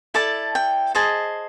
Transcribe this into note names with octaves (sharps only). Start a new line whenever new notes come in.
E4 A4 D5 A5
G5
G#4 C5 D#5 A5